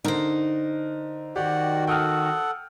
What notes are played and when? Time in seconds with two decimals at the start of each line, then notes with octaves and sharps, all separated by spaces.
0.05 D3 D#4 A#4 C5
1.36 D#3 F#4 G4 D5 F#5
1.87 A4 F#5 G5 D#6 F6